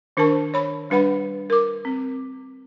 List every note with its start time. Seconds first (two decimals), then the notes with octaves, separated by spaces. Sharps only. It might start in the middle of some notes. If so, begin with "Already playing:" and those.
0.17 D#3 D4 A#4 C5 A5 C#6
0.54 C#5 B5
0.90 G3 D4 B4 F#5 B5
1.50 A#4 D6
1.85 C4